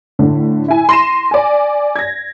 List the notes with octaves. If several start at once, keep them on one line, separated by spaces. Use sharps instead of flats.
A2 D3
E4 G#5
C6 A#6 D#7 E7
D5 G#5
G#6 A#6